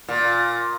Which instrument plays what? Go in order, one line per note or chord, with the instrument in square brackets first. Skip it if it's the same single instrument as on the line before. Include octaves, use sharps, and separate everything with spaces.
[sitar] A#2